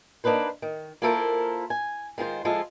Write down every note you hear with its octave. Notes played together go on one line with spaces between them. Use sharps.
A#3 D4 D#4 B4 C5
D#3
A#3 E4 F4 A4 A#4 C5
G#5
D#3 G#3 F4 C5
F3 G#3 E4 F4 A4